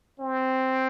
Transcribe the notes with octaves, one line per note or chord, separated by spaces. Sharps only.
C4